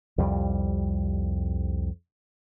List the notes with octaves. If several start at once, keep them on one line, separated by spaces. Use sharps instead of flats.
C2 F2 G3